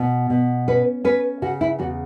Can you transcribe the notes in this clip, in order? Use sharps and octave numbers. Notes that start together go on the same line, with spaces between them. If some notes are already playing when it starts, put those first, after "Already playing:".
Already playing: B2
B2
C#4 B4
C#4 B4
C#3 F#4
E4
E2 F#4